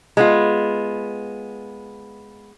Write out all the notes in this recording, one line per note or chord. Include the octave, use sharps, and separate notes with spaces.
G#3 B3 F4